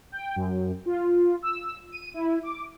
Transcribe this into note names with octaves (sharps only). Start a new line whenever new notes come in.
G5
F#2
F4
E6
D#7
E4
D6